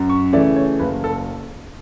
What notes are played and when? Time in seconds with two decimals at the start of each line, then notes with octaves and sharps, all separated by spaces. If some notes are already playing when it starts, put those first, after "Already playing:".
Already playing: F#2
0.10 C#6
0.33 C#3 E3 A3 D5
0.56 C#5
0.79 F#1 B4
1.04 A4